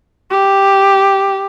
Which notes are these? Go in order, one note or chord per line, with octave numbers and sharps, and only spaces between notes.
G4